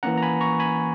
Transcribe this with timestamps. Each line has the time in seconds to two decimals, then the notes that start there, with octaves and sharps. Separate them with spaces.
0.03 E3 A#3 C#4 F#5 A#5
0.17 A#5
0.22 G#5 B5
0.41 A#5 C#6
0.60 G#5 B5